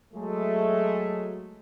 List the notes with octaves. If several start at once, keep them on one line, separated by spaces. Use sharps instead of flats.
F#3 G#3 A3